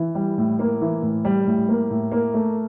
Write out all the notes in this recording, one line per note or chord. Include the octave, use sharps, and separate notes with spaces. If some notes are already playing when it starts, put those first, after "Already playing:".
Already playing: E3
G3
A2
A#3
E3
A2
G3
A2
A#3
A2
A#3
A3